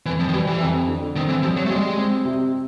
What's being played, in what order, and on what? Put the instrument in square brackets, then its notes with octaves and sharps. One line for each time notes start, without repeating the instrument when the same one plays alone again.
[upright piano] F2 [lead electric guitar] E3
[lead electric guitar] F3
D#3
[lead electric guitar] E3 [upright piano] G3
[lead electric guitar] E3
[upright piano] F2
D3
[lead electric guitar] D#3 [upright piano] C4
[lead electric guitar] E3
[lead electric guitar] F3 [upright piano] G3
[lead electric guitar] F#3
A3
[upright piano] G3 [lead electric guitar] G#3
[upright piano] C4
C3